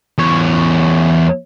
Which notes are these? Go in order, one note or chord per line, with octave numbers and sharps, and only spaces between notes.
E2 C#5